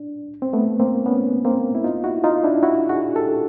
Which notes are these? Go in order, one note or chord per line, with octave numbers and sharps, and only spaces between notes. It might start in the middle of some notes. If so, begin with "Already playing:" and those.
Already playing: D4
C4
A3 B3
A#3 C4
B3 C#4
A#3 C4
E4
D#4 F4
E4 F#4
D#4 F4
D4 E4
E4 F#4
F#4 G#4
G4 A4